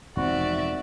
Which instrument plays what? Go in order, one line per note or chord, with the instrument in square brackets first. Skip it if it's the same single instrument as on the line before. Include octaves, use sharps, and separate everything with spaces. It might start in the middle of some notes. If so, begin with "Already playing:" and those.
[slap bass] E1 F3 [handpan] D#3 C4 [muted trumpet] F#4 [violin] D5 E5